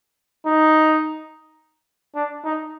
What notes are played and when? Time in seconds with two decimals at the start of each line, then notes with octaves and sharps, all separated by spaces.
0.46 D#4
2.15 D4
2.45 D#4